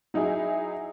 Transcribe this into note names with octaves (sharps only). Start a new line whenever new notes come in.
F#3 D#4 E4 G#4